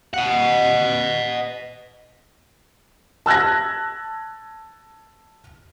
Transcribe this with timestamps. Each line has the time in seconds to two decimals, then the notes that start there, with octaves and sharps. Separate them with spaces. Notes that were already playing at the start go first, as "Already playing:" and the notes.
0.14 D#5 F#5
3.26 A5 E6 F#6 G#6 A#6